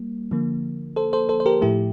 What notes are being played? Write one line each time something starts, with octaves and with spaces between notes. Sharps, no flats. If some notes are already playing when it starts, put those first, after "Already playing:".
Already playing: G3 A#3
D3 F3 A#3
A4 C5
A4 C5
A4 C5
C5
G4 A#4
A2 F3 A3 E4 G4